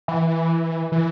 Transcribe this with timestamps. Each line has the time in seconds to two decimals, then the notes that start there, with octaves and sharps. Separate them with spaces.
0.08 E3
0.92 E3